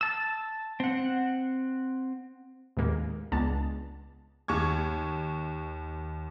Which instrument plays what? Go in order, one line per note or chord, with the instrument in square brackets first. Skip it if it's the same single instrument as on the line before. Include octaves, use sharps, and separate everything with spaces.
[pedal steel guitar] A5 E6
C4 F#5
[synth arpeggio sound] D#2 A2 G#3 A#3
C#2 G#3 B3 D4 A5
[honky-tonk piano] D#2 C#6 G#6